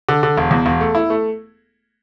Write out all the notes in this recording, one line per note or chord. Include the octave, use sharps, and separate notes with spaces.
D3
D3
E1
E2
E1
A3
E4
A3